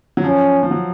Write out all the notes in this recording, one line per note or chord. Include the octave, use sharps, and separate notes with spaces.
F#3
F3 C#4
F3
F#3